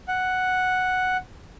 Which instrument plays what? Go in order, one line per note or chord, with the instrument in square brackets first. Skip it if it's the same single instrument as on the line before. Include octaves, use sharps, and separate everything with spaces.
[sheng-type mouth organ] F#5